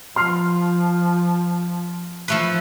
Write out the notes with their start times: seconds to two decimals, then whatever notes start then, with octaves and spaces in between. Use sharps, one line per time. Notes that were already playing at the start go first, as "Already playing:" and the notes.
0.16 F3 C6 F6 C7
2.28 F3 A3 B4